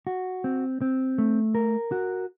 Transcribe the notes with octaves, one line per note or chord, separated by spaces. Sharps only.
F#4
C4
C4
A3
A#4
F#4